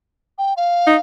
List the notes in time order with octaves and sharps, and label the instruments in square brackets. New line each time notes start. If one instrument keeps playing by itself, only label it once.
[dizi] G5
F5
[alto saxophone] D#4